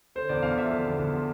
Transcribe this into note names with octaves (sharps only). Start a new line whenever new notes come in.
D3 C5
E2 D5
E2 F5
F3 E5
D3
E2
E2
F3